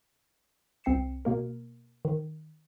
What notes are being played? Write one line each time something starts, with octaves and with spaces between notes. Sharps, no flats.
C2 C4 G5 C7 C#7 E7
B2 A#3 A#4
D#3